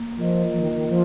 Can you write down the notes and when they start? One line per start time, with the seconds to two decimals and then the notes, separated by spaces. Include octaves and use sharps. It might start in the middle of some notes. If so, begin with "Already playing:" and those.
Already playing: A#3
0.17 F3 F4 A#4 D#5
0.53 F3 A#3
0.60 D#3
0.75 D#3
0.88 F3 F4